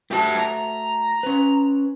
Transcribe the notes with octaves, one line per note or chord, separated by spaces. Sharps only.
A3 F#4 G4 E5 A5
A#5
C#4 B4